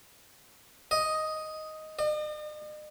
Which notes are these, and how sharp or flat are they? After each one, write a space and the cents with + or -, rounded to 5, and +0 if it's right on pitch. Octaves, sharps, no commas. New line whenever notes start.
D#5 +5
D#5 -45